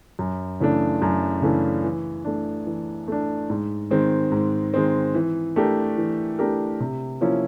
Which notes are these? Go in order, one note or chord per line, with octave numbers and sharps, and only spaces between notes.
F#2
C#3 E3 A3 D4
F#2
C#3 E3 A3 D4
E3
A3 D4
E3
A3 D4
G#2
D#3 G#3 C4
G#2
D#3 G#3 C4
E3
A3 D4 G4 A#4
E3
A3 D4 G4 A#4
C3
F3 A#3 C#4 E4